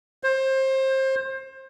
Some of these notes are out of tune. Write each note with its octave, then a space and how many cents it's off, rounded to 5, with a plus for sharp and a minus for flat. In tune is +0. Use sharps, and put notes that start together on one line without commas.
C5 +25